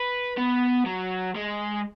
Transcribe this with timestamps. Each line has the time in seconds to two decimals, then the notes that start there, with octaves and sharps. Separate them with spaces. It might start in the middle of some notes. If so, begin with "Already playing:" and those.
Already playing: B4
0.37 B3
0.86 F#3
1.35 G#3